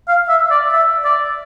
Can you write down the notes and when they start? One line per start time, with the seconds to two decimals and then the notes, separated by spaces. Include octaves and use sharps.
0.08 F5
0.29 E5
0.51 D5
0.72 E5
1.04 D5